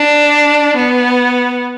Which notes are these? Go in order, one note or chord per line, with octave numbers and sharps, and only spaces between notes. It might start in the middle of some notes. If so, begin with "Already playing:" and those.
Already playing: D4
B3